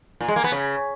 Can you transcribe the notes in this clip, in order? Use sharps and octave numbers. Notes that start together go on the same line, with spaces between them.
A#2
G#3
A#3
B3
C#3